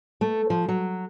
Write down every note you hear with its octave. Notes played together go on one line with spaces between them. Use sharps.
A3
F3
F#3